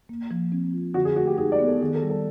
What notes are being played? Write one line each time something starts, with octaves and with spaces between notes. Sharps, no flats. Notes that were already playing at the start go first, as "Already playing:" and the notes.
A#3
F3
C4
F4
D3 F#4
G#4
A3 F#4
G4
D#4 G#4
D5
B3
A4
D#3 G#4
A4
G3
A4